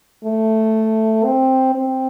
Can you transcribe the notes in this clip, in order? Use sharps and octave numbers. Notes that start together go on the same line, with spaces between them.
A3
C4
C4